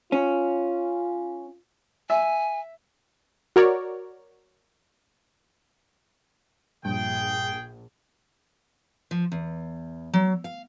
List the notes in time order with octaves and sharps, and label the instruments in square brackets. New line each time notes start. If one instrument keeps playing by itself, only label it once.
[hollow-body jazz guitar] C#4 [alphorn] F4
[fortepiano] E5 [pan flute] G#5
[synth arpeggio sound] F#4 A#4 C#5 D5
[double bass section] A#1 [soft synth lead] G2 [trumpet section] G#4 G5
[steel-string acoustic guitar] F3
E2
F#3
F5